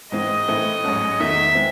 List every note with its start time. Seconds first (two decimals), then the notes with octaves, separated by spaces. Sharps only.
0.12 G#2 E3 C4 D#5
0.48 A2 E3 C4 E4 A4
0.84 A1 G#2 F#3 C#4 F#4
1.20 E2 D#3 A3 D#4 E5
1.55 G#3 C4